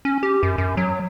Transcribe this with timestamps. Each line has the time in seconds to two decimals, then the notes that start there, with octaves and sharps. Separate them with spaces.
0.05 C#4
0.23 G4
0.43 F#2
0.58 F#2
0.77 F#3